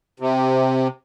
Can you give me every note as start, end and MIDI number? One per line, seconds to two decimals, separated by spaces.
0.20 0.88 48